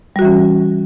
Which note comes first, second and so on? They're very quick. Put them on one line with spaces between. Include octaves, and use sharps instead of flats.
G3 F#4 E3 C#4